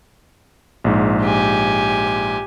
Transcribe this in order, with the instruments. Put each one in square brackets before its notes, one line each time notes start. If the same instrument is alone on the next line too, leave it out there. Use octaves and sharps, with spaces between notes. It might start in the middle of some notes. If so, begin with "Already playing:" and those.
[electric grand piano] A#1 G#2
[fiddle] G4 G#5